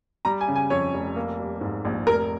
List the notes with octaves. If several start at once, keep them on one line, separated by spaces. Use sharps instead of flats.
G3 A#5
G#5
C#3
G#5
F2 C#5
F1
A#3
G3
G#2
A#1
F1 A#4